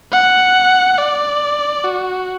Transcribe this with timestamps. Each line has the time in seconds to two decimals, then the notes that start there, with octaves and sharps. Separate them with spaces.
0.12 F#5
0.98 D5
1.84 F#4